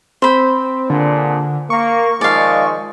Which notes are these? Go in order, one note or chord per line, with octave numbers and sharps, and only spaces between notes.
C4 C5 B5
A#2 D3 D4 G#4
A#3 C#6
D#3 F3 G#3 D5 F5